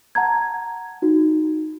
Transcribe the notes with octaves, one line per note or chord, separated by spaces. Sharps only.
F#5 A5 A#5 G#6
D#4 F#4